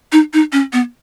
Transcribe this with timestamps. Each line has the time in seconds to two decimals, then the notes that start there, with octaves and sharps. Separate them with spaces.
0.12 D#4
0.33 D#4
0.52 C#4
0.73 B3